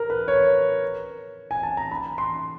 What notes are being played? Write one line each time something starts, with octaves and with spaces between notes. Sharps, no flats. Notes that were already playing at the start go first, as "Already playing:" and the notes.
Already playing: A#4
B4
C#5
G#5
A5
A#5
B5
C6